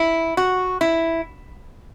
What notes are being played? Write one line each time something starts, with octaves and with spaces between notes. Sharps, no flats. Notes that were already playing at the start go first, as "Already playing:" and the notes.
Already playing: E4
F#4
E4